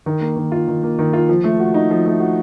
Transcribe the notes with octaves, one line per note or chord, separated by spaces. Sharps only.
D#3
A#3
D#3
F4
D#3
A#3
D#3
F4
F3
A3
F#4
D#4
F3
A3
F#4